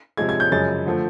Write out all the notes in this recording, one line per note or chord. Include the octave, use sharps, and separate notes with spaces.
C3 F3 G#3 G#6
G#6
G6
F#2 C#3 F3 G#3 A6
D3 F3 A3